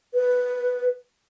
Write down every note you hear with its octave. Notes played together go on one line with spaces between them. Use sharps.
B4